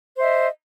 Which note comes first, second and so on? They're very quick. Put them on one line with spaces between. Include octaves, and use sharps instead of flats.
C5 E5 D#5